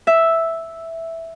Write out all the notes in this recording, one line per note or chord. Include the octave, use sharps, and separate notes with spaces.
E5